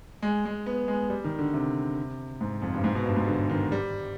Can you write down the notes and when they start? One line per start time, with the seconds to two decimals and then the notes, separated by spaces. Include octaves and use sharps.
0.23 G#3
0.45 G#3
0.66 B3
0.88 G#3
1.10 G3
1.24 D#3
1.39 D3
1.54 C3
2.41 G#2
2.62 F2
2.74 G2
2.84 G#2
2.95 B2
3.06 G2
3.16 G#2
3.27 D3
3.50 D#3
3.72 G3